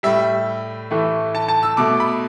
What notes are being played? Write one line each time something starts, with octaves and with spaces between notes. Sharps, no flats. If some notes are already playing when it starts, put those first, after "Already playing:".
A2 G3 E5
A2 E3 A3
A5
A5
E6
B2 A3 D6
B5